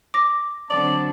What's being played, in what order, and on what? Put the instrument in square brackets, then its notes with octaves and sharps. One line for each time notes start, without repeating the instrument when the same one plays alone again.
[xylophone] D6 A#6
[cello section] D3 F#3 C4 [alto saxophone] D5 [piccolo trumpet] A5